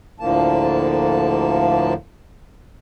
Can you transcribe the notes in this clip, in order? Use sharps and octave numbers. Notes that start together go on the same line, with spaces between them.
D2 A2 D3 F3 A#3 A5